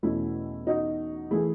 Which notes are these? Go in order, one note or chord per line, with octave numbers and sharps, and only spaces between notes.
E2 B2 A3 C#4 E4
D#4 F#4
E3 A3 E4 G#4